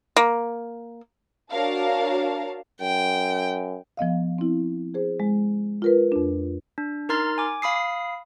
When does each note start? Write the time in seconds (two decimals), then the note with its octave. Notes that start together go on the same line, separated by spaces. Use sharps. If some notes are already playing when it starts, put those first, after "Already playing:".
0.16 A#3
1.52 D4 F#4 A#4 C#5 F5 A5
2.81 F#2 G5
3.97 F3 B3 D#5 F5
4.38 C4 E4
4.94 G#4 C5
5.20 G#3
5.82 F4 A#4 B4
6.12 F2 D4
6.78 D4
7.09 D#4 A#4 A#5 C6 F6 A6
7.38 G#5 D6
7.62 F5 B5 D#6 C7